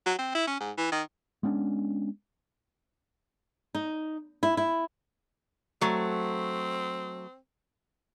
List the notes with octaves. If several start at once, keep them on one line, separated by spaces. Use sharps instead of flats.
F#3
C4
E4
C#4
G#2
E3
D#3
G#3 B3 C#4 D4
D#4
E4
E4
F#3 A3 C4